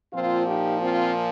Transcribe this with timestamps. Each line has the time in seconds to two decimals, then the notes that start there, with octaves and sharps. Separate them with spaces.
0.13 A#2 F3 C4 F4
0.47 D#4 G4
0.81 C4 F4